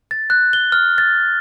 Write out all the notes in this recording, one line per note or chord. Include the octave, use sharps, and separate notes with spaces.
A6
F#6
G7
F6
A6